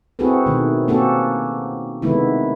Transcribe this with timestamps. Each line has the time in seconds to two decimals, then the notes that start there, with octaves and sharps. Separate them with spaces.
0.19 C4 E4 F#4 G#4 A4 B4
0.46 B2 D#3 A3
0.88 A#3 C4 C#4 F#4 G4 A4
2.02 C3 D#3 G#3 A3 B3 E4